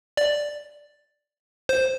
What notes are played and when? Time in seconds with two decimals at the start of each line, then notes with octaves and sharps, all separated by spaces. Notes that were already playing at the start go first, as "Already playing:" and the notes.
0.17 D5
1.69 C5